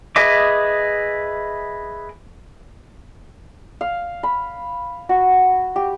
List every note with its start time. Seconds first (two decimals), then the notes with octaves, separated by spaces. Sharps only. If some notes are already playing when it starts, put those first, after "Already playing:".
0.16 G#4 B4 D#5 E5 D6
3.81 F5
4.23 B5
5.09 F#4
5.76 G4